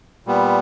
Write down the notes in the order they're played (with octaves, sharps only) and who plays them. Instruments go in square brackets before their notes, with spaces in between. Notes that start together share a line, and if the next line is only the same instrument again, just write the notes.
[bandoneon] A#2 G3 B3